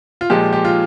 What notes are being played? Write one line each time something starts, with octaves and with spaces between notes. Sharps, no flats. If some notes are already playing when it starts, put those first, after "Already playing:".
F4
A#2 F3 G#3 G4
G4
F4